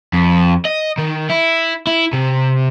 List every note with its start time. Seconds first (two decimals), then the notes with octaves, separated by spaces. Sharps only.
0.13 F2
0.65 D#5
0.98 D#3
1.29 E4
1.87 E4
2.13 C3